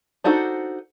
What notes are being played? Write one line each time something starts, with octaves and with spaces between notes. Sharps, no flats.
D4 D#4 F#4 A4 C5